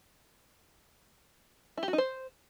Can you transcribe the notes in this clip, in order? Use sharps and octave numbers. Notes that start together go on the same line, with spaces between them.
E4
G4
F#4
D#4
C5